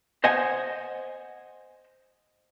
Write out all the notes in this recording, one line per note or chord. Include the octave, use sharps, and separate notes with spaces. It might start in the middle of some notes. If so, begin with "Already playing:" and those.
C5 D#5 F#5 G#5